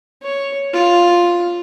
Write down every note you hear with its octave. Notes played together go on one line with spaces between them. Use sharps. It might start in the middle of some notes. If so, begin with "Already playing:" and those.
C#5
F4